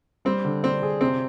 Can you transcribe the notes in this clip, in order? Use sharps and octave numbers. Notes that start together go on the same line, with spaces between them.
G3 C4
D3
C4 D4
G#4
C3 C4